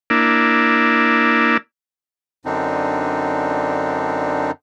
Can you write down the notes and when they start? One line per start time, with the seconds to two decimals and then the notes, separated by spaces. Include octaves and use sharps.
0.10 A#3 D4 E4
2.45 F#2 D3 C4 D4 D#4